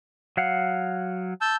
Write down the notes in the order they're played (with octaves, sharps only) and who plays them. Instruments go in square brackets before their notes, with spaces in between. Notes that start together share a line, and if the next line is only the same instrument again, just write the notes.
[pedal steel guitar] F#3 F5 F#5
[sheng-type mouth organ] A5 E6 G6